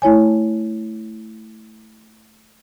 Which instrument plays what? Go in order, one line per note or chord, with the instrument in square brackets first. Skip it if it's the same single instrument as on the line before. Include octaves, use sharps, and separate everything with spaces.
[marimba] A3 E4 C#5 G#5